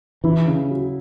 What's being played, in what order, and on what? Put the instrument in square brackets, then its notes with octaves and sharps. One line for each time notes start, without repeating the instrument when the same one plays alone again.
[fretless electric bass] E3 [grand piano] E4
[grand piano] C#3
F#3